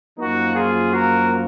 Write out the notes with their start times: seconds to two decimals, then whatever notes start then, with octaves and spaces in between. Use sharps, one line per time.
0.18 F#2 F3 A#3 D#4 F#4
0.55 F4 G#4
0.92 F#4 A#4